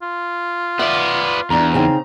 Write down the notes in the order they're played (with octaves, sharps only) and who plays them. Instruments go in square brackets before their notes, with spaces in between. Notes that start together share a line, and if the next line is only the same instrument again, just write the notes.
[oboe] F4
[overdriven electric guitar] B3 D5 [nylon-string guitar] E5
[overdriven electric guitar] E2 [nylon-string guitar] E3 D4 [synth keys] A#5
[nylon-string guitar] C#3 C4 D#4